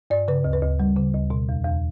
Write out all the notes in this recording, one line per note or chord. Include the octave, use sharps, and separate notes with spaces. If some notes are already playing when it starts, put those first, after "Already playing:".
G2 D5
C#3 B4
D2
B4
D2
G3
C#3
D2
B2
E2
E2